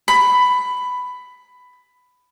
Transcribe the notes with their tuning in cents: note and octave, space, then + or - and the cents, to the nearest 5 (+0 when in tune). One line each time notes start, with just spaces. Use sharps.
B5 +10